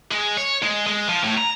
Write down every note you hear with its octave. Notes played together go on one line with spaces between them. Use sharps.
G#3
C#5
G#3
G#3
F3
A2
A#5